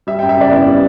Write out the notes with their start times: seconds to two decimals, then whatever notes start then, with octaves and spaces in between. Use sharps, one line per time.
0.07 G3 E5
0.19 G5
0.22 F#2
0.29 E5
0.37 C#3 D5
0.52 B3 E4
0.67 G3